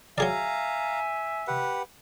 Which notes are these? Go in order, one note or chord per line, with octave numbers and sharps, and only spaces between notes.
F#3 G#4 D5 E5 F5 G#5 A#5
G4 B4 F#5